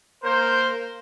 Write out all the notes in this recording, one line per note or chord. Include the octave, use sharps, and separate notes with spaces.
A#3 A#4 C5